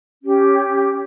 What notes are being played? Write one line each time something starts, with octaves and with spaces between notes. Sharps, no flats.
C#4 G4